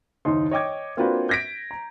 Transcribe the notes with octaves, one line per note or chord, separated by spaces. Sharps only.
F#1 D#2 D#4 C6
C#5 D#5 G5 D6 G#6
A#3 C4 D4 F4 F#4 B4
G6 G#6 A#6 B6 D7
A#5